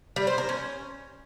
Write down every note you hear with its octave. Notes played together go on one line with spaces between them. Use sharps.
G3
C5
A#4
C#4